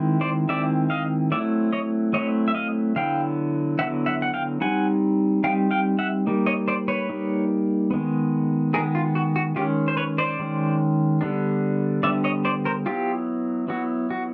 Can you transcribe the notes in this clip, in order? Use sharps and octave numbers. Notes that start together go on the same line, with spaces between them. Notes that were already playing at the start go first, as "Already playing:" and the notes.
Already playing: D#3 G#3 C4 E4
C5 D5
D#3 G#3 C4 E4 D5 E5
D#5 F5
F#3 A3 C4 E4 D5 E5
C#5 D#5
F#3 A3 C4 E4 C#5 D#5
E5
D#5 F5
D3 F#3 B3 E4 F5 G5
D3 F#3 B3 E4 E5 F#5
E5 F#5
F#5
F5 G5
G3 C4 D#4 F#5 G#5
G3 C4 D#4 F5 G5
F5 G5
E5 F#5
G3 A#3 D#4
C#5 D#5
C5 D5
B4 C#5
G3 A#3 D#4
D#3 G#3 B3
D#3 G#3 B3 G#4 A#4
F4
F#4
F#4
D#3 G#3 C#4 F4 G4
C5
B4 C#5
C5 D5
D#3 G#3 C#4
D3 G3 B3 D4
D3 G3 B3 D4 D5 E5
C#5 D#5
C5 D5
A#4 C5
F#3 B3 E4 F4 G4
F#3 B3 E4 F#4
F#4